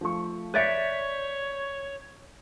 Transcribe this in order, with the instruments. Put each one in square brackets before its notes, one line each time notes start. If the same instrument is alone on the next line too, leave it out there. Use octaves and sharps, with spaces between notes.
[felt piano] F3 A3 C#6
[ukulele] B4 D5 E5 [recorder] C#5 [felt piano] G6 B6 C#7